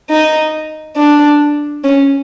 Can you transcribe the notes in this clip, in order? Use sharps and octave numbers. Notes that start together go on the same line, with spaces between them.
D#4
D4
C#4